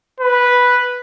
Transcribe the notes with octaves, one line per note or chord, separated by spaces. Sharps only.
B4